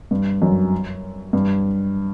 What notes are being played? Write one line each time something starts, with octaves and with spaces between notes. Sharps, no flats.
G2
F#2
G2